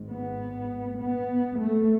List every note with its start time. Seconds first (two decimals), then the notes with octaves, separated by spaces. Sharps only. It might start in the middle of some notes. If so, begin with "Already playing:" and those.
Already playing: G#1 G#2
0.11 B3
1.00 B3
1.59 A3